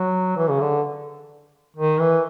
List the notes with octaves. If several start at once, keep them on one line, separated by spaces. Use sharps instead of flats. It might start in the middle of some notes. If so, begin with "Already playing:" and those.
Already playing: F#3
E3
C#3
D3
D#3
E3